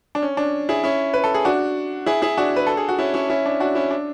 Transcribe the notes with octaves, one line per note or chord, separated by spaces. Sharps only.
D4
C#4
D4
E4 G#4
C#4 E4
B4
A4
G#4
D4 F#4
E4 G#4
E4 G#4
D4 F#4
B4
A4
G#4
F#4
C#4 E4
C#4 E4
C#4 E4
D4
D4 F#4
C#4 E4
D4